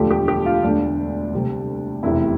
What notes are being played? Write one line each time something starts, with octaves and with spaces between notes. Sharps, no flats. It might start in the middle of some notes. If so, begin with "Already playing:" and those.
Already playing: E1 D2 D3 F3 A3 G4
G4
G4
F4
E1 D2 D3 D4
D2 C3 G3
F1 E2 C3 E4